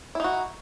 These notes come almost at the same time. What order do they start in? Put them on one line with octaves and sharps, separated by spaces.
E4 D#4 F#4